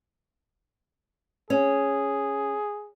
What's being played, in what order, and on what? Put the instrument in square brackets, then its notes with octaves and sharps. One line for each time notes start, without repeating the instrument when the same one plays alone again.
[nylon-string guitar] C#4 [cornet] G#4